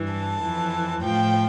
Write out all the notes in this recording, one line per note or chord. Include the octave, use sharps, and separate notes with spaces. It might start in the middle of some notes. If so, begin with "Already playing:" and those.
Already playing: G2 E3
A5
F2 E3
A2 F3 G5